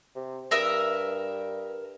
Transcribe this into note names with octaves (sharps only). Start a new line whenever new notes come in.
C3
G2 A#4 E5 D#6